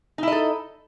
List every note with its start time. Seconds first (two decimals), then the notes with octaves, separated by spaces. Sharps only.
0.18 D#4
0.23 E4
0.28 D#5
0.32 A4